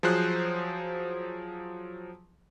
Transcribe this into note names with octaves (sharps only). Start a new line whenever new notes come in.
F3 F#3 G#4 C5 F#6